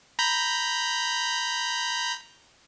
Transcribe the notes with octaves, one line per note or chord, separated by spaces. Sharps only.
A#5 B5 G6